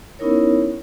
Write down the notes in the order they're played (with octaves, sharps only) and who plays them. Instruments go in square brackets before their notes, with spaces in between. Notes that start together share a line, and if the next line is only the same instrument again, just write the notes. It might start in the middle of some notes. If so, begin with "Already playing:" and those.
[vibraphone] B3 C#4 D#4 E4 A#4 C#5